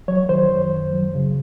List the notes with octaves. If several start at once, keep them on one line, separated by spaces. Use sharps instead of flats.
F#3 C#5
D#3 C5
F#2
F#2
F#3
C#3